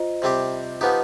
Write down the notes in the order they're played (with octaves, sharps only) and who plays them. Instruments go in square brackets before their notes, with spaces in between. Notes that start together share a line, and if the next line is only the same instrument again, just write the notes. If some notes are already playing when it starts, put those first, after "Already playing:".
Already playing: [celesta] F4 C5 D#5
[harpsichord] C3 G3 C4 G4
F3 B3 D#4 G4